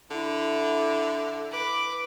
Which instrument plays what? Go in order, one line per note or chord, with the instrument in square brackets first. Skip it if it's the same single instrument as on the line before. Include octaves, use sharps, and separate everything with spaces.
[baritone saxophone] D3 [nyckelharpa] E4
[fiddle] B4 D6